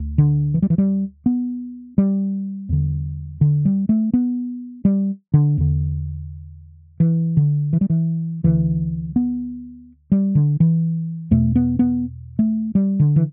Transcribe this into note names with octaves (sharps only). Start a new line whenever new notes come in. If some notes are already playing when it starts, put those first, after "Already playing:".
Already playing: D2
D3
E3
G3
E3
G3
B3
G3
E2 D3
D3
G3
A3
B3
G3
D3
E2 D3
E3
D3
E3
G3
E3
D2 D3 E3
B3
G3
D3
E3
E2 B2 A3
B3
B3
A3
G3
D3
E3